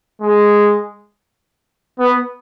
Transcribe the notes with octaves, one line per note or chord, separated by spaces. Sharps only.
G#3
B3